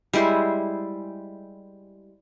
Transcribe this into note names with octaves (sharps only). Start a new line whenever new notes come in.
G3 G#3 E4 C5